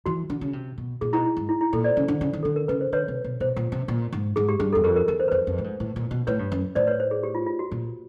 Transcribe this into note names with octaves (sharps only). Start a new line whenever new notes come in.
E3 F#4
D3
C#3
C3
B2
A#2 G#4
B2 E4
E4
G#2
E4
E4
A#2 A4
C5 D5
C#3
D3
C#3
D#3
D3 A4
A#4
C#3 B4
C5
D3 B4 C#5
C3
B2
B2 C5
A#2
C3
A#2
G#2
G#2 G#4
G4
G2 G#4
E2 A4
F2 A#4
A#4
E2 A#4
C5
B4
F2 C5
F2
A2
G#2
A2
A#2
B2
A2 B4 C#5
G2
F#2
A2 C5 D5
B4 C#5
C5
G#4
G4
F4
F4
F#4
A#2